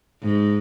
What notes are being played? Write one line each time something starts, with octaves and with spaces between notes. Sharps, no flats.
G#2